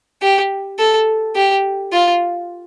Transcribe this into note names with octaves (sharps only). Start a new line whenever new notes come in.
G4
A4
G4
F4